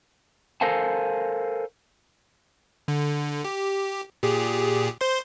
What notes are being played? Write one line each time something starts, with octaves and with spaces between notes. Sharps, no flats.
A4 A#4 C5 F5 G#5 A5
D3
G4
A#2 G4 G#4
C5 C6